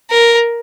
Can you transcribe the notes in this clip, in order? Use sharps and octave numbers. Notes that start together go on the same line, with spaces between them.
A#4